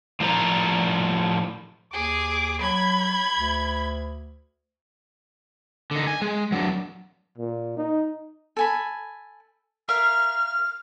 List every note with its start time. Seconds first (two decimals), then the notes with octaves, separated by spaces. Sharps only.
0.20 A2 F3 D4 C5 D5 A#5
1.93 D#2 G#4 D6
2.62 F#3 B5 G#6
3.38 D2
5.91 D3 D#4
6.07 G#5
6.22 G#3
6.52 F#3 D4
7.38 A#2
7.77 D#4
8.57 A4 G#5 B5
9.89 A#4 E5 F5 F6